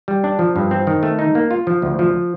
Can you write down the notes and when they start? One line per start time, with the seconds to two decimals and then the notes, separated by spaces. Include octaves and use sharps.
0.08 G3
0.24 D4
0.39 F3
0.56 G2
0.71 C4
0.87 D#3
1.03 A3
1.19 D#4
1.35 A#3
1.51 F4
1.67 F3
1.82 D2
1.99 F3